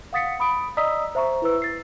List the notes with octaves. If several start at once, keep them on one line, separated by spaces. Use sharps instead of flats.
F5 F#5 D#6 A6 B6 C#7
B5 D#6 D7
D5 D#5 A#5 D#6 E6 B6
C5 E5 A#5 C#6
E4 B4 E6
A6 C7